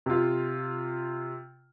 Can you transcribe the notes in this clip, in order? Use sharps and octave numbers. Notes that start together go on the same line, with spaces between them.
C3 F4